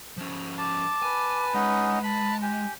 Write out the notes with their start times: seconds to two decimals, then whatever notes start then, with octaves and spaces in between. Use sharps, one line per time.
0.17 F3 C#4
0.58 A5 D6
1.02 B4 G#5
1.54 G#3 C#4 D#4 D#5 F#5
2.03 A5 B5
2.42 G4 G#5